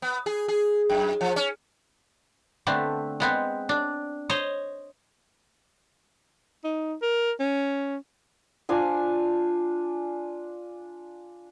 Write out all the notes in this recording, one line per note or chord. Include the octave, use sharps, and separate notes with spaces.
B3
G#4
G#4
F#2
F3
C#4
D3 A3 B3 C4
G#3 B3 C4
D4
C5 C#5 D#5
D#4
A#4
C#4
D4 F4 F5 G#5